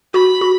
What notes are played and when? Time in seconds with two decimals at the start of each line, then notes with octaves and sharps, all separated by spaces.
0.14 F#4 B5
0.41 F#4